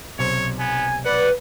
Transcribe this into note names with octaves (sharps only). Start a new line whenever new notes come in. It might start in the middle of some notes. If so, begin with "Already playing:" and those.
B1 C3 C5 C#5
B3 G#5
B4 D5 F#5